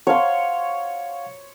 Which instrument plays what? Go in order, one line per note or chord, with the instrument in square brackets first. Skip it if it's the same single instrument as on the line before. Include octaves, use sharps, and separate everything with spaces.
[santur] C#5 C6 [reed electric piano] F5 F#5